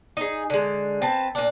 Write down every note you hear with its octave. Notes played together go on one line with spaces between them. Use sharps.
D#4 G#4
D3 G#3
C4 B4 A5
A#2 D4